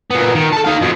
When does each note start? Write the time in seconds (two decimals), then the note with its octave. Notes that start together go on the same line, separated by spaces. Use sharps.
0.10 A#2 B3
0.35 D#3
0.52 A4 A5
0.64 D#4 F5
0.81 F2 B2